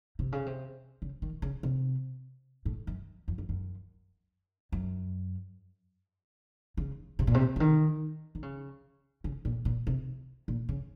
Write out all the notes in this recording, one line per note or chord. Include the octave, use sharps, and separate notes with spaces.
C3
C#3
C3
C#3
D#3
C#3
C3
A2
F#2
F2
F2
F#2
F#2
C#3
C3
A#2
C3
C#3
D#3
D#3
C#3
C#3
A#2
A#2
C3
A#2
C#3